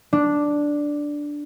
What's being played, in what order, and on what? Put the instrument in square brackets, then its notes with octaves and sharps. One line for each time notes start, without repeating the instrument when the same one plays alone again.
[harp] D4